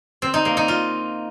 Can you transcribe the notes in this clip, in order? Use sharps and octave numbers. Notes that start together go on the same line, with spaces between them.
C4
D#4
A#3
D#4
F4